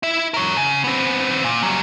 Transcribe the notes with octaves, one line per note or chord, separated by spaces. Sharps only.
E4 E5
A#4 C#5
C#3
B3 C4
A#2
F#3 G3